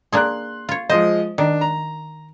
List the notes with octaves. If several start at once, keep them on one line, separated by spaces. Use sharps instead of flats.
A#3 D4 G#4 C6 F#6
F4 C#5
F3 G#3 C5 D#5
D#3 D4
A#5